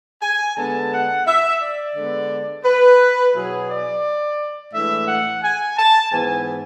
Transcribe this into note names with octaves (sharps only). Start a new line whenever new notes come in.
G#5
D3 G#3 B3 A5
F#5
E5
D5
D3 G#3 B3 D4
B4
B2 F#3 B3 E4 G#4
D5
A2 E3 G#3 D4 E5
F#5
G#5
A5
G#2 E3 B3 G#5